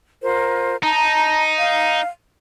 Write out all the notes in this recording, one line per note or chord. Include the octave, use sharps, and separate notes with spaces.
F4 A#4 C5
D#4 A5 A#5
F5